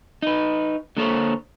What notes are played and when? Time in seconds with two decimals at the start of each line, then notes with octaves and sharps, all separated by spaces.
0.22 D#4 B4
0.97 D3 A#3 A4 C5 C#5